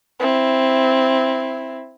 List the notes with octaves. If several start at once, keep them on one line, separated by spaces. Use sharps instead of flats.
C4 E4